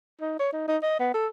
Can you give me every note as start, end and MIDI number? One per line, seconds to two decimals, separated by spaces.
0.21 0.39 63
0.39 0.49 73
0.53 0.63 63
0.68 0.77 63
0.83 0.99 75
0.99 1.09 59
1.14 1.27 69